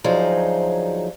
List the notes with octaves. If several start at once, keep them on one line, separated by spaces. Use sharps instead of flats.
D2 F3 F#3 D#4 G#4 C5